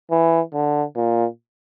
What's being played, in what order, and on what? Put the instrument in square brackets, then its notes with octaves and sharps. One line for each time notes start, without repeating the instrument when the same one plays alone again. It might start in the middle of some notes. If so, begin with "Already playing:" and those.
[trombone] E3
D3
A#2